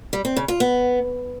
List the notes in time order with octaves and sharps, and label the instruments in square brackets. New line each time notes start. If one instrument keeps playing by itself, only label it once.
[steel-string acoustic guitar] G3
C4
C#3
F4
B3